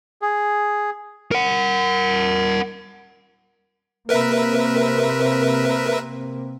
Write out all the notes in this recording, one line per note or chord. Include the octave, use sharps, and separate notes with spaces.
G#4
A#4 F#5
C3 A#3 C4 A#4 B4 E5